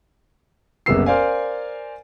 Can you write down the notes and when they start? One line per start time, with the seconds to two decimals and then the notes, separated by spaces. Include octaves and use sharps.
0.86 F#1 C2 A#3 B3 E6 C7
1.06 A#4 C5 D5 F5 G#5